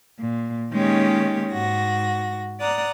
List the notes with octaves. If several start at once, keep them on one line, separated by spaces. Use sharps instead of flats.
A#2
D#3 G#3 A#3 C#4 G4 C#5
G#2 F#4 A#6
D5 F#5 A#5 D#6